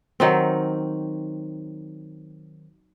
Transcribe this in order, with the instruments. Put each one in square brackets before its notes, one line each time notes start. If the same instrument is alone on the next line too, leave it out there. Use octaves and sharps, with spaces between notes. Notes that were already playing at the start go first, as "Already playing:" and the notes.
[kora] D#3 F#3 C4